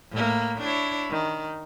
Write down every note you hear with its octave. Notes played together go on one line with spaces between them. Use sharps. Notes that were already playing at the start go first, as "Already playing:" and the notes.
A2 A#3
D4 E4 C#5
D#3